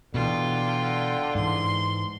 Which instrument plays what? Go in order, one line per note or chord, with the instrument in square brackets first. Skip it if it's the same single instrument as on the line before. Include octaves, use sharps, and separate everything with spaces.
[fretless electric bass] B2 E3 [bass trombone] D3 [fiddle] F4 G5
[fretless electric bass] G#2 E3 [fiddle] C6